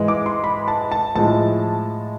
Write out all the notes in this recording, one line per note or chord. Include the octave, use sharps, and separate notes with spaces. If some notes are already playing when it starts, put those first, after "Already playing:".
Already playing: G#2 E3 G#3
D6
C6
B5
A5
A5
A2 F3 G#3 A5